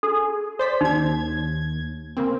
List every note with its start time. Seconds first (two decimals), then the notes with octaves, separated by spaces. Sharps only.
0.03 G#4 A4
0.59 C5 D5 B6
0.81 D#2 D#4 G#6
2.17 C#3 A#3 C4